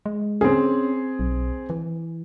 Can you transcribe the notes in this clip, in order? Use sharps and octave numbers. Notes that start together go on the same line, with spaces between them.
G#3
C4 C#4 G#4
B1
E3